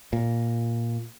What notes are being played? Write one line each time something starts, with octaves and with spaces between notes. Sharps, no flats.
A#2